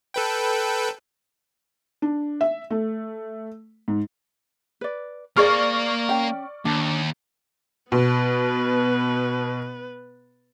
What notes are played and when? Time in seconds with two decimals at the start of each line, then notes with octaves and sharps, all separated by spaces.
0.14 A4 B4 G5
2.02 D4
2.41 E5
2.70 A3
3.88 G#2
4.81 B4 D5
5.36 A#3 G#4 A#4 C5 D5 C#6 F6
6.09 C#4 G5
6.65 D#2 D4 A5
7.92 B2 B3 B4